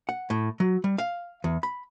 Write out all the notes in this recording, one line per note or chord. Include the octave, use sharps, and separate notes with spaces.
F#5
A2
F#3
G3
F5
E2
B5